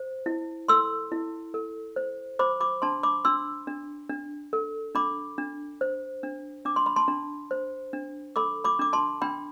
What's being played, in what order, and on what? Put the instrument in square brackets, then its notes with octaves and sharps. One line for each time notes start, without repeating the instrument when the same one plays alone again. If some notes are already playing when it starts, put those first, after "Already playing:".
Already playing: [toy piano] C5
E4
A4 C6 E6
E4
A4
C5
C5 B5 D6
B5 D6
D4 A5 C6
B5 D6
D4 C6 E6
D4
D4
A4
D4 B5 D6
D4
C5
D4
D4 D6
C6
B5
A5 C6
D4
C5
D4
A4 B5 D6
B5 D6
D4 D6
A5 C6
D4 G5 B5